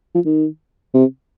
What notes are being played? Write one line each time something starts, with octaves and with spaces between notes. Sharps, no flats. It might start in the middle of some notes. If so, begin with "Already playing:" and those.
F3
D#3
C3